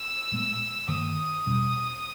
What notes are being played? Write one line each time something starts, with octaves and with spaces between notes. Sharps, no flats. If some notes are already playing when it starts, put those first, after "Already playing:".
Already playing: E6
A#2 G#3 B3
G2 D#3 A#3 D#6
E2 B2 G3 C#4